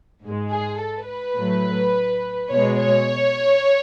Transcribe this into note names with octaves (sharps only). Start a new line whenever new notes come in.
G#2 G#3
G#4
A4
B4
A2 F#3 A3
B2 G#3 C#5
C#5